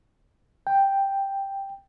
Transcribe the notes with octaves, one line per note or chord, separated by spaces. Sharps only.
G5